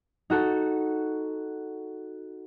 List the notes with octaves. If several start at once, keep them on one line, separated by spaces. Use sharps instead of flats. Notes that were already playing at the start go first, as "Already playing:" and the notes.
D#4 F#4 A4